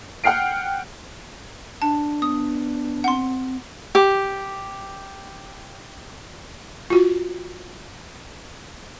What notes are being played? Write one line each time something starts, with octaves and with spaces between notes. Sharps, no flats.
F#5 G5 F6 C7 D7
D4 A5
B3 D#6
C4 F#5 C6
G4 D6
F4 F#4